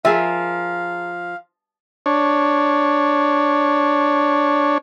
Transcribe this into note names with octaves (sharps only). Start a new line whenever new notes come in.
F3 G4 G#4 A#4 E5 F5
D4 C#5